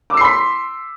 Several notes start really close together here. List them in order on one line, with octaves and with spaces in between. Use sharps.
D6 E6 C7 C6 B6